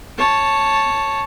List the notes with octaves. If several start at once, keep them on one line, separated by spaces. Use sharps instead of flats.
C#5 A5